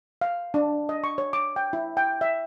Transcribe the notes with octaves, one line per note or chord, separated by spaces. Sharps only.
F5
D4
D#5
C#6
C#5
D6
G5
E4
G5
E5